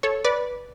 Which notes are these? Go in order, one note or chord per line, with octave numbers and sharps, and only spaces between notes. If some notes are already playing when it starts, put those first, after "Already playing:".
A4 C#5
B4 D5